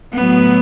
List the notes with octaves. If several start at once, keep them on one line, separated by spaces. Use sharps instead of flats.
A2 F#3 B3